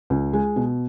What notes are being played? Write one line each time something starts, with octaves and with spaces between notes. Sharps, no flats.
C#2
G#3
B2